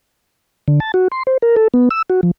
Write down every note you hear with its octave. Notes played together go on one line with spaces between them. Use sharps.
D3
A5
F#4
C6
C5
A#4
A4
B3
E6
F#4
F3